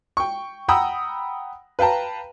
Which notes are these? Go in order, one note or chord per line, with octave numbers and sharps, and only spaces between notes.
G5 C#6
F#5 G5 A#5 B5 D#6 E6
B4 F5 G5 A5 A#5